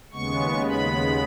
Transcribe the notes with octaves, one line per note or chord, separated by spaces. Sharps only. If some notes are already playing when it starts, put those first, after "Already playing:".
D#2 C#3 G#3 B3 C#6
B5